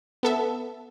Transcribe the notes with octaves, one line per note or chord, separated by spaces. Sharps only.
B3 A4 E5